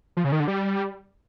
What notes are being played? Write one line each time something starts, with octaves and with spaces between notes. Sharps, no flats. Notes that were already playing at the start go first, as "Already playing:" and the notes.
F3
C#3
D#3
D3
G3